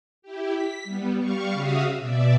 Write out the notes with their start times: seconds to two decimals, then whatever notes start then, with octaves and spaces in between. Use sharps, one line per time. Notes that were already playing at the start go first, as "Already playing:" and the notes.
0.22 E4 G4
0.52 B6
0.84 G3 B3
1.18 G3 F5 C#6
1.53 C#3 F#4 E5 F5 D#6
1.98 B2 D5 E5